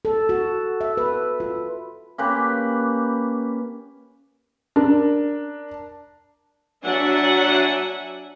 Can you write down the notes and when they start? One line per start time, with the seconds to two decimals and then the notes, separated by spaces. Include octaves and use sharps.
0.05 A4
0.29 F#4
0.81 E5
0.97 B4
1.40 F4
2.18 A#3 C#4 G4 B4
4.76 D4 A#4
6.82 F#3 D4 E5 F#5 G#5